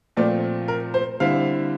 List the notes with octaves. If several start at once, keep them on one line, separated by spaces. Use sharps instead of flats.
A#2 F3 A3 C4 F4 D5
A#4
C5
D3 G3 C4 E4 F5